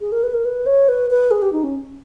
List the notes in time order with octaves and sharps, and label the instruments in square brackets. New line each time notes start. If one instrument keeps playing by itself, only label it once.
[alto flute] G#4
A#4
B4
A#4
B4
C#5
B4
B4
G#4
G4
D#4
C#4